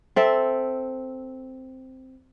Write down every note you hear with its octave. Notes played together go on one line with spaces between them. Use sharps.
C4 A4 E5